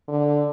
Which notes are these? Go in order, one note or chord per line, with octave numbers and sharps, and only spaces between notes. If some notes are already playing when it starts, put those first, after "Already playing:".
D3